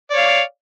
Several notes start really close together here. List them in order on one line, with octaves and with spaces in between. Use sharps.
D5 C#5 F5